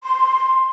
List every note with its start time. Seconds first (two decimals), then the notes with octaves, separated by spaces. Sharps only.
0.03 C6